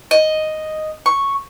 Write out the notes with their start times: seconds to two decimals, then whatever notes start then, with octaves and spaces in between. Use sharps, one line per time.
0.11 D#5
1.06 C#6